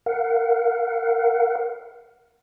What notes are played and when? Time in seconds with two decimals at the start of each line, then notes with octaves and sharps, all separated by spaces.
0.06 A#4 F5 F#5